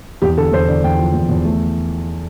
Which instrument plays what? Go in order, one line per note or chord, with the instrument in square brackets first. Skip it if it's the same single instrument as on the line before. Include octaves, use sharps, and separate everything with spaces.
[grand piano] E2 G4
D3 A4
E2 C5
D3 D5
E2 G5
F3
E2
E2
A3